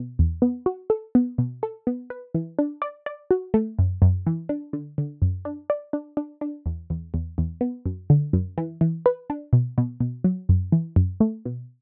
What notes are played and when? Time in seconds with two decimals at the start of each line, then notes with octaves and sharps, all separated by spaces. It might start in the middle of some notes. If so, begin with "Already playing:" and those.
Already playing: B2
0.19 E2
0.42 B3
0.66 F#4
0.90 A4
1.15 B3
1.38 B2
1.63 A4
1.87 B3
2.10 B4
2.34 E3
2.59 D4
2.82 D5
3.06 D5
3.31 F#4
3.54 A3
3.79 F#2
4.02 F#2
4.27 E3
4.49 D4
4.73 D3
4.98 D3
5.22 F#2
5.45 D4
5.70 D5
5.93 D4
6.17 D4
6.41 D4
6.66 E2
6.90 E2
7.14 E2
7.38 E2
7.61 B3
7.86 F#2
8.10 D3
8.33 F#2
8.58 E3
8.81 E3
9.06 B4
9.30 D4
9.53 B2
9.78 B2
10.00 B2
10.24 F#3
10.49 F#2
10.72 E3
10.96 F#2
11.20 A3
11.45 B2